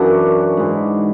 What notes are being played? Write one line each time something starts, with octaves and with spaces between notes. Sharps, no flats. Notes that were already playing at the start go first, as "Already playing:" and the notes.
Already playing: F#2 E3 D4 F#4
G#2 E3